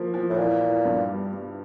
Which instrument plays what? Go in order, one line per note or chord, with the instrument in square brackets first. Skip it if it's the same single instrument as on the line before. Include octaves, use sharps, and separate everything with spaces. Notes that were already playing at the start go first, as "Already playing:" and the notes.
Already playing: [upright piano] F3 A#3
F3
[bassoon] A2
[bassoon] A#2 [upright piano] E3
[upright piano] E3
G2
G3
G3